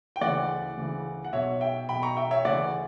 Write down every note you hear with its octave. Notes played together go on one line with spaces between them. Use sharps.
G5
D2 C#3 E3 D5 F#5
D2 C#3 E3
F#5
B1 B2 C#5 E5
E5 G5
B1 B2 G5 B5
A#5 C#6
E5 G5
C#5 E5
D2 C#3 E3 D5 F#5